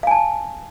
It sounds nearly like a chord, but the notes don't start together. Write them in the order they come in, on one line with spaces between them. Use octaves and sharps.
F5 G#5 A5